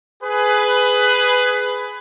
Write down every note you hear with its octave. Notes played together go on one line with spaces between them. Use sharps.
G#4 B4